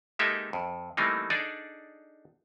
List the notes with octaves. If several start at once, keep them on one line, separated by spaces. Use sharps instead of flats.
G#3 A#3 D#4 G4 A4 E5
F2
E3 G3 A3 A#3 C4 D#4
D4 D#4 G#4 A4 D5